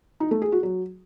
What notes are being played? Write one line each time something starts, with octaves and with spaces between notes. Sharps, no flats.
D#4
A3
G#4
F#4
F#3